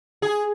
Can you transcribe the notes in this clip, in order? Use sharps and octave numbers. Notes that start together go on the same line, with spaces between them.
G#4